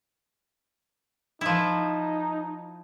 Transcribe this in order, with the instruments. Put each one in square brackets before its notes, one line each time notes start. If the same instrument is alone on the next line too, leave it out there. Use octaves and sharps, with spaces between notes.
[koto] F3 E4 [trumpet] D#4